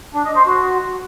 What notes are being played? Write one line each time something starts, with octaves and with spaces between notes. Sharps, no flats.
D4
D#5
C5
F#4